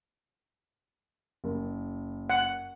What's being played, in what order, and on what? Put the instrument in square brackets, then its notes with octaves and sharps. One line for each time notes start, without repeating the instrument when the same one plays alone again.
[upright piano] F#1
[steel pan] F#5